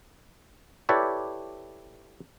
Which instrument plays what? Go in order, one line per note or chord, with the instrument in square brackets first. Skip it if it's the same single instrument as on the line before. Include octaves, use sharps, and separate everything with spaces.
[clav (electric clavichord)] E4 G4 A4 B4 C#5 D5